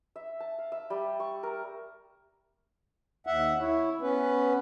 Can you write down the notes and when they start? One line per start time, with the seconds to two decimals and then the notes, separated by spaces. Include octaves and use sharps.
0.16 E5
0.40 A5
0.58 F5
0.72 E5
0.90 G3
1.20 C#6
1.43 A#4
3.27 D#2 E5 F#5
3.60 E4 C#5
4.02 B3 C#4 B4